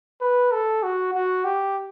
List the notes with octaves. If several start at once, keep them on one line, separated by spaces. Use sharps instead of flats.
B4
A4
F#4
F#4
G4